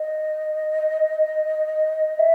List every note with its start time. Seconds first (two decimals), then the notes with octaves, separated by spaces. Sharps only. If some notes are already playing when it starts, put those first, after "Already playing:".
Already playing: D#5
2.19 E5